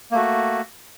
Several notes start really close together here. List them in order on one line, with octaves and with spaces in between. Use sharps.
A#3 A3 F#4